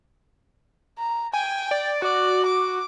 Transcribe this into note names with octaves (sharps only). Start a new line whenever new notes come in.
A#5
G5 G#5
D5
F#4 D5
D6